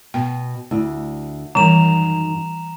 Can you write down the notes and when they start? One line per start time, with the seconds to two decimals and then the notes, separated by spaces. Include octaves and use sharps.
0.14 B2 G5
0.71 D2 E4
1.55 F#2 D#3 E3 G3 A#5 E7 F7